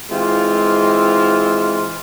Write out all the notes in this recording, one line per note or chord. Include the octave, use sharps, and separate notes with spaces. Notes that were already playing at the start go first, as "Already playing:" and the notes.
E3 G#3 C4 F4